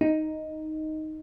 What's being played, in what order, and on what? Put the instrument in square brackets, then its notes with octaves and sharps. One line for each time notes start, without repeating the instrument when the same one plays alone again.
[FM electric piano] D#4